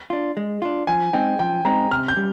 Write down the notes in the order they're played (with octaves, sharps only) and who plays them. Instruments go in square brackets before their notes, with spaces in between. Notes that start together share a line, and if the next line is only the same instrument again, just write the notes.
[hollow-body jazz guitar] D4 F4
G#3
D4 F4
[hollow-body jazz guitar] F3 [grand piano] G#5
[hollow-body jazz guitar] G#3 C4 D#4 [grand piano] G5
[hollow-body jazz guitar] F3 [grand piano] G5
[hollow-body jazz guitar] G#3 C4 D#4 [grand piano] A#5
[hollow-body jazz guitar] C3 [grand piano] F6
[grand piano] G6
[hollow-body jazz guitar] G3